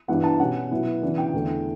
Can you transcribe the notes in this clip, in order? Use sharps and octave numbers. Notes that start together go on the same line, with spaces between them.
G2 E3 B3 F#5
A5
B2 G3 C#4 F#5
B2 F#3 B3 E4
C#3 E3 B3 D4
G5
E2 D3 A3